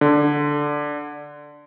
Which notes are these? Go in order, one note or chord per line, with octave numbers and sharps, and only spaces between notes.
D3